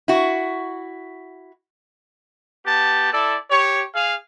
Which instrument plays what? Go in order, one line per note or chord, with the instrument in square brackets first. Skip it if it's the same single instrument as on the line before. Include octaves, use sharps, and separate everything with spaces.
[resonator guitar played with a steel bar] E4 F#4
[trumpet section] B3 G4 A5
E4 A4 D5
G4 C#5
G#4 F5